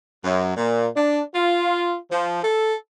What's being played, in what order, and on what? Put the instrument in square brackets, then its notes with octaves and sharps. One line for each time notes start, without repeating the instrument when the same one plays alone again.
[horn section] F#2
A#2
D4
F4
F3
A4